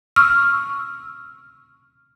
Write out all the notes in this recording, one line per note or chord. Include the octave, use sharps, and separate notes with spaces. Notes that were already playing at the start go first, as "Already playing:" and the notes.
C#6 E6 F6